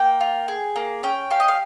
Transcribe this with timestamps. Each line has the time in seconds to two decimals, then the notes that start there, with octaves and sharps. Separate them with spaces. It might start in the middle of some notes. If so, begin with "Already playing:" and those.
Already playing: A#3 G5
0.21 F4
0.48 G#4
0.76 A#3
1.03 C#4 G5
1.31 G4 F5
1.40 D#5
1.48 F5